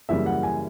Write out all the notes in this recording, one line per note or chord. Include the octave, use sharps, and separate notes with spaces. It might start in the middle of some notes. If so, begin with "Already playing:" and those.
F#2 C#3 E3 G3 A#3 E5
F#5
G#5